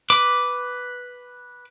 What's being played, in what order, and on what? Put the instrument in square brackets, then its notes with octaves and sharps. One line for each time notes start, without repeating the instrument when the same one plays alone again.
[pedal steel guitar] B4 D6